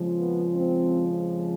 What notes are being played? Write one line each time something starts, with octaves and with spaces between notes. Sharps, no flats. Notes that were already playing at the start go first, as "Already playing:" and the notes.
Already playing: F2 C#3 F3 G#3
B3
C4